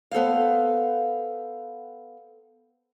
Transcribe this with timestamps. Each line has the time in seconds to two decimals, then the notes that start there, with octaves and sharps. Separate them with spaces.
0.11 B3 A4 C5 F5